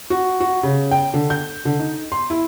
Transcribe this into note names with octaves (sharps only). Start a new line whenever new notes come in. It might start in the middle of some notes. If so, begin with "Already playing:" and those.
F#4
F#4
C#3
G5
D3
G6
D3
D#4
C6
E4